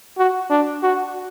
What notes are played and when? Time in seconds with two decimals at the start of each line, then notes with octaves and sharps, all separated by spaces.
0.18 F#4
0.50 D4
0.83 F#4